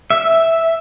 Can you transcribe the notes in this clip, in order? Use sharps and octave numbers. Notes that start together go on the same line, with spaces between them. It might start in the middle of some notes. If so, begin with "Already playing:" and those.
E5